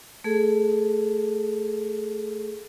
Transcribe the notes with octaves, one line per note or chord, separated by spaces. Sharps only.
A3 G#4 A4